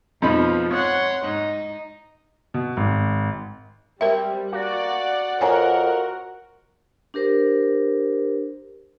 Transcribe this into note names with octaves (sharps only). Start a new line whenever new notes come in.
F2 B2 F3 D#4 B5
C#5 F#5 C6
G#2 D#4
B2
G#1
G3 C4 A#4 E5
A#3 F#4 D5 F#5
F2 A#4 C#5 F#5 G#5 A#5
D4 G4 A#4 C5